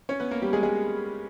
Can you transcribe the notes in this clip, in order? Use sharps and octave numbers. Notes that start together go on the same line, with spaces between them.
C#4 C#5
B3 B4
A#3 A#4
G3 G4
G#3 G#4
G#3 G#4